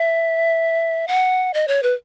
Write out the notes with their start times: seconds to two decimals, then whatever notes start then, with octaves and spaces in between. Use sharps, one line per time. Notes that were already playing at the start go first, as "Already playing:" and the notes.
Already playing: E5
1.08 F#5
1.54 D#5
1.68 C#5
1.83 B4